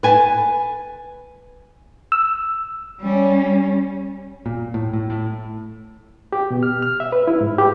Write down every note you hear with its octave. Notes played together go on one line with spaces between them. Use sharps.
B4 G#5 A5
E6
G3 C#4
A#2
A2
A2
A2
G4
B2
F6
F6
E5
B4
E4
G#2
G4